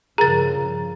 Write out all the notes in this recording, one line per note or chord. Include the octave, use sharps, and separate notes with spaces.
G2 C#3 F3 G#4 A#4 A#5 A6